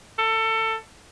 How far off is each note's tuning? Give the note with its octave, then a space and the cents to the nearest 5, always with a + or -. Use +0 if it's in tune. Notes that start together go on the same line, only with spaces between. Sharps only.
A4 +25